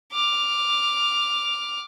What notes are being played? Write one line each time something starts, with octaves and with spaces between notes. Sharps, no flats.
D6 F6